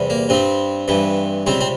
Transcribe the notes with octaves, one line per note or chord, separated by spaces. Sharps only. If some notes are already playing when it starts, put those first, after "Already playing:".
Already playing: E2 C3 G3
A#3
G2 G3 C4
G2 E3 G3
C#2 C3 G3 C4
C4